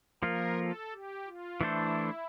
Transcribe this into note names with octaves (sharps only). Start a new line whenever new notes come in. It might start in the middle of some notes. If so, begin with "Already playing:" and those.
F3 A#3 F4 A#4
A4
G4
F4
E3 A3 D4 E4 A4 C5